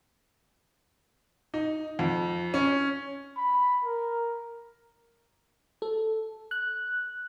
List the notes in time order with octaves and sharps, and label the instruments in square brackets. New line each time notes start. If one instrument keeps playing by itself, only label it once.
[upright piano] D#4
F2
C#4
[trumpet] B5
A#4
[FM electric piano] A4
F#6